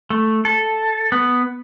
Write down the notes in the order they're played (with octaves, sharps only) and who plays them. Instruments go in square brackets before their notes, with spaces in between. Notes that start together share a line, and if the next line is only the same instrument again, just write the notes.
[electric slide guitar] A3
A4
B3